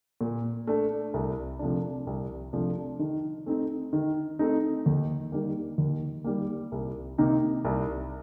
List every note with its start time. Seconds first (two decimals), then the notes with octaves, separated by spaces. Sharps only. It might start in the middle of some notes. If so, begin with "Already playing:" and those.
0.21 A#2
0.67 A3 D4
1.14 C2
1.59 C3 F3 A3 D4
2.07 C2
2.53 C3 F3 A3 D4
2.99 D#3
3.46 A3 C4 D#4
3.93 D#3
4.39 A3 C4 D#4
4.86 D#2
5.32 D#3 G3 A#3
5.78 D#2
6.24 D#3 G3 A#3
6.72 C2
7.18 C3 D#3 A#3 D#4
7.65 C2